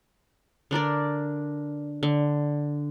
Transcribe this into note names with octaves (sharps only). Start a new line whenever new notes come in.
D3 D4 A#4 D5
D3